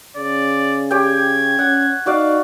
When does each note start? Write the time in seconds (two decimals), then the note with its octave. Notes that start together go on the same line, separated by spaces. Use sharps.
0.17 C#3 D5
0.91 G4 C#5 G5 G#6
1.59 C#4 F#5
2.06 D#4 F#4 D5 F5